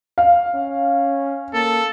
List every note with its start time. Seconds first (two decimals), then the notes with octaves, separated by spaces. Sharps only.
0.18 F5
0.54 C#4
1.54 A#3 A4